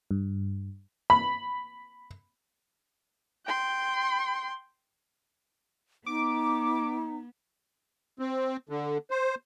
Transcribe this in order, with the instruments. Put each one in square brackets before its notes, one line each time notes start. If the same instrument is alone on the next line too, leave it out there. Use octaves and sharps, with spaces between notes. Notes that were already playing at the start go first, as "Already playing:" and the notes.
[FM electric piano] G2
[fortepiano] B5
[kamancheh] G5 C6
[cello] B3 [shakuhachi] D#4 [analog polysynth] D6
[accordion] C4
D3
C5